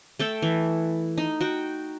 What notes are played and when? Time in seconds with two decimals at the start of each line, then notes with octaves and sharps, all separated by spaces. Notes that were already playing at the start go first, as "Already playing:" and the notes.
0.19 A3 A4 G5
0.42 E3
1.18 D#4
1.41 F#4 G5